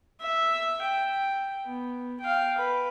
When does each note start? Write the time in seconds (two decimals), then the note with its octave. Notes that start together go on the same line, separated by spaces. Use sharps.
0.21 E5
0.82 G5
1.66 B3
2.20 F5 G5
2.58 B4